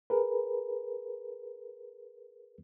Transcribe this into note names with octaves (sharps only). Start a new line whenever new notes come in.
G#4 A#4 B4